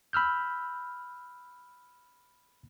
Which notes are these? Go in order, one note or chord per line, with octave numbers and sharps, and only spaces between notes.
B5 E6 F6 G6